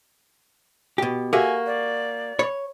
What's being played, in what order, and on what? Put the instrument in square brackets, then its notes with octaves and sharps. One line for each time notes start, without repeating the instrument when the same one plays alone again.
[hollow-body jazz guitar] B2 G4
[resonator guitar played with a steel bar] A#3 [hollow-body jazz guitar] F#4 [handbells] G4 A4 E5 [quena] G#5
[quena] D5
[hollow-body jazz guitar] C#5 [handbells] B5